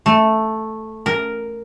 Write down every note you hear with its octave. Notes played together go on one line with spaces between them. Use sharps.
A3
A#4